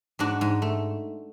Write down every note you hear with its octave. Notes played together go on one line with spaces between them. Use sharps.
G#2 D4 F#4
G#2
A3